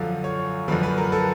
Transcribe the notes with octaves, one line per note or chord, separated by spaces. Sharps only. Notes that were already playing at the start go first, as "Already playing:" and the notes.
Already playing: F#2 D3 F3 F5
C#5
F#2 D3 F3 B4
B4
A#4
A4